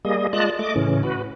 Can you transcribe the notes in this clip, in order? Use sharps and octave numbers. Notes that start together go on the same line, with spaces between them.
G3 A#3 G#4 D#5
G#3 F4 D5 D#5 A5 F#6
A3 D#5 D6
A2 C#3 E3 C#4
F#4 B4